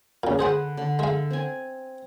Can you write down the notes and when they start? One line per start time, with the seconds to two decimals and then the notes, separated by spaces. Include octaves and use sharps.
0.24 A#2 C#3
0.39 D3 G#4 B4 C5 F#5
0.77 D3
0.99 G#3 E5 F5
1.30 C4 G#5